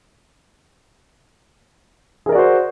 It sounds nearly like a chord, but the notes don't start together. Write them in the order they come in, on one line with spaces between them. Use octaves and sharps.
G#4 A#4 D5 F#4 C5